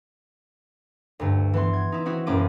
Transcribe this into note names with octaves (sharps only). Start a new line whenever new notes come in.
D2 G2
E3 B3 C6
G#6
D#4 E4
C4 D#4 E4 F#4
E1 F#2 A#3 C#4 D6 D#7